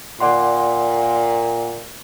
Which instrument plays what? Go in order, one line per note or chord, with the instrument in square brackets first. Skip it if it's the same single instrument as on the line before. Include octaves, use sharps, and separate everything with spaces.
[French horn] A#2 [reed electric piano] D5 F#5 C6